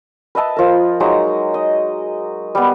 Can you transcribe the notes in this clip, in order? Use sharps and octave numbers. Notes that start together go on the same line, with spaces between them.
B4 D#5 E5 A5
F3 A#4
F#3 G#3 D#4 A#5
D#5
G3 B3